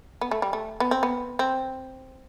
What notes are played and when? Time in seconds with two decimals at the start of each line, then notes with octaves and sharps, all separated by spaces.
0.21 B3
0.31 A3
0.42 G3
0.53 A3
0.80 B3
0.91 C4
1.03 B3
1.39 C4